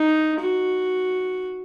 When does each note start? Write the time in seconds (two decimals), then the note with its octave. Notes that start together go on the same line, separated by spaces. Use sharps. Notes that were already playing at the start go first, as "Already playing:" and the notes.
Already playing: D#4
0.40 F#4